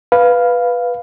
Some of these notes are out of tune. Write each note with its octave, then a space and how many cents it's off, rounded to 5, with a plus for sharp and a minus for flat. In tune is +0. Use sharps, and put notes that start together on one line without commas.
B4 +0 F5 +0